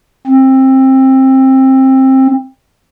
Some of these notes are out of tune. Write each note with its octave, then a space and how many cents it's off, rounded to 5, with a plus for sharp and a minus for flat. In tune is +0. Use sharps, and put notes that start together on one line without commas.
C4 +20